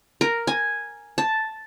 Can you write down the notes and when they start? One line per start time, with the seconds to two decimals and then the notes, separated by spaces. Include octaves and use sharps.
0.21 A#4
0.47 G#5
1.18 A5